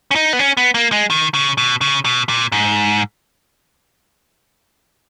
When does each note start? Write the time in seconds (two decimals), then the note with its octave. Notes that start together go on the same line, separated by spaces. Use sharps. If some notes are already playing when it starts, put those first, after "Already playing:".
0.11 C#4
0.15 D#4
0.33 B3
0.39 C#4
0.57 B3
0.74 A#3
0.92 G#3
1.10 D#3
1.34 C#3
1.58 B2
1.81 C#3
2.05 B2
2.29 A#2
2.52 G#2